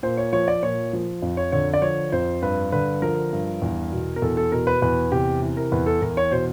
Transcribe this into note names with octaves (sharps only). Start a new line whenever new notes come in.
A#2 C5
C#5
F3 C#5
D5
A#2 C#5
F3
F2
C#5
D3 C#5
D5
F3 C#5
F2 C5
G2 B4
D3 B4
F3 A#4
G2
E2
B2
A#4
E2 A4
A4
B2 A#4
B4
E2 B4
C3 G4
E3
A#4
E2 B4
A4
E2 A#4
C#5
B2 C5